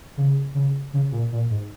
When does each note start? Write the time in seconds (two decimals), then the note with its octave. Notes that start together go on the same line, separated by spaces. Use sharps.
0.17 C#3
0.55 C#3
0.93 C#3
1.12 A#2
1.32 A#2
1.50 G#2